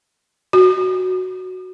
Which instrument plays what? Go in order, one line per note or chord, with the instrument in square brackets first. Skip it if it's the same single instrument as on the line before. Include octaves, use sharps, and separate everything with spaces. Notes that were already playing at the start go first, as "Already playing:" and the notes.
[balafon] F#4